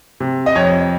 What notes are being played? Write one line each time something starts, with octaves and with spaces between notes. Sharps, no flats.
C3
D#5
F2 C#5